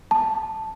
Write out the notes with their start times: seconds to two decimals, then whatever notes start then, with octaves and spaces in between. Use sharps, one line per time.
0.11 A5